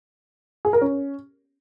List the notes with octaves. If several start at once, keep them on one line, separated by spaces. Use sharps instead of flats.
G#4
A#4
C#4